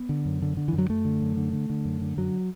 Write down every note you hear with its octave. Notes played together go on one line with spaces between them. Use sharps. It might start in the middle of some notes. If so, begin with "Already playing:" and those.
Already playing: B3
D3
F#2
D3
D3
F#2 E3
F#3
F#2 A3
D3
F#2
D3
D3
D3
F#2
D3
F#2 F#3